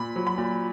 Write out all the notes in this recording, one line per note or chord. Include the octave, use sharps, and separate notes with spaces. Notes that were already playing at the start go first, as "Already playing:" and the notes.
Already playing: A#2 B5
F#3
B5
A#2